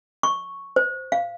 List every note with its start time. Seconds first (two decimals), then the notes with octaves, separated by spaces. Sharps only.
0.23 C#6
0.76 C5
1.12 F5